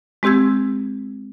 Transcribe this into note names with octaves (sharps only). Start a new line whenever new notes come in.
G#3 C4 G4 E6 G#6